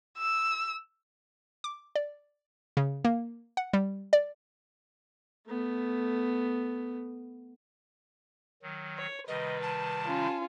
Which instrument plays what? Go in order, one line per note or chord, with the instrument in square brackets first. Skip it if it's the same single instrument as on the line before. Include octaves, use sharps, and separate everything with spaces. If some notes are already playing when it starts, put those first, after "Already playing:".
[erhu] E6
[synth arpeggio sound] D6
D5
C#3
A#3
F#5
G3
D5
[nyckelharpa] A3 B3
[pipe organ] D#3 F#3
[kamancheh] C#5
[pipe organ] C3 D#3 G3 [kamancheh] B4 [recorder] D#5
[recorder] A5
[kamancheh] C#4 F4